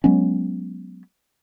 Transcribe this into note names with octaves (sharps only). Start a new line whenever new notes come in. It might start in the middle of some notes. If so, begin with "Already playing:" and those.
F#3 G#3 B3 C#4